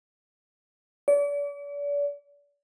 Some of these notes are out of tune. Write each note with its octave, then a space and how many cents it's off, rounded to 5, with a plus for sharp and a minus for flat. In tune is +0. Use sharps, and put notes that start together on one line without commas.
D5 -40